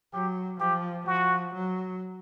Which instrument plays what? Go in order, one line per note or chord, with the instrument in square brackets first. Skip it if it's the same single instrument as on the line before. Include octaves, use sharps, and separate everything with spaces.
[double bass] F#3 [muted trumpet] G4
[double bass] F3 [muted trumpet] G4
[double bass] F3 [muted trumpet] F#4
[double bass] F#3